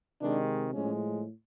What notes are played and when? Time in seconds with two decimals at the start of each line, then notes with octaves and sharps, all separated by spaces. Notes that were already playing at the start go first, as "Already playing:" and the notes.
0.21 C3 D#3 G#3 D4
0.74 A2 F3 G#3 C#4